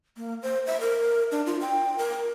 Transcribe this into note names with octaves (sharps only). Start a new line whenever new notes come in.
A#3
C5
E5
A#4
D4
F4
G5
A#4